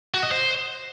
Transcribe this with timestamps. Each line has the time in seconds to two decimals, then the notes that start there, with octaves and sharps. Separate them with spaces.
0.14 F#4
0.23 D#5
0.31 C5